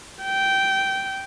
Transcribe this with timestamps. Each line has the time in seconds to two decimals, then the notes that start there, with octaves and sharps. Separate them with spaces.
0.23 G5